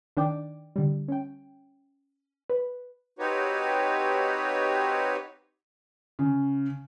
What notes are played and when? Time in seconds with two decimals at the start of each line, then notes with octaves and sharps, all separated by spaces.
0.17 D#3 D4 D5 G5 D6
0.76 D3 G3
1.08 C#4 G5
2.50 B4
3.19 C4 D#4 F#4 G4 B4 C#5
6.19 C#3